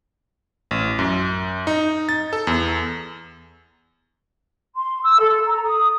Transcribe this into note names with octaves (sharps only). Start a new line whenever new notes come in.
A1
F#2
D#4
A6
A4
E2
C6
E6
A4
A#5
D#6